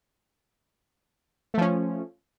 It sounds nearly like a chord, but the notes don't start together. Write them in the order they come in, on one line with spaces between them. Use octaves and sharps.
A3 F3 C#4